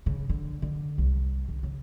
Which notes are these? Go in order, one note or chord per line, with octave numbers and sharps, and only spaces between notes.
C#3
D3
D3
C2
D3
C#3